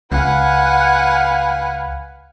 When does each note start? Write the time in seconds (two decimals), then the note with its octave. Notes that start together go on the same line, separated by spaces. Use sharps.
0.12 C#2 B4 F5 F#5 G#5